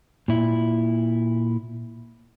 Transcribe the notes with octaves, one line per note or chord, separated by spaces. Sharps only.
A#2 E4